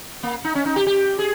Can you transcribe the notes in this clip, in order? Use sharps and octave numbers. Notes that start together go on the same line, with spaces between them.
A#3
D#4
C#4
D#4
G4
G4
G#4